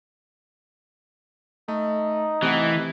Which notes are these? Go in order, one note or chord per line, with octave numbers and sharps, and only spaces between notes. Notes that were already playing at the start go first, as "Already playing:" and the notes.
A3 D#4
C3 E3 A3 D#5 F#5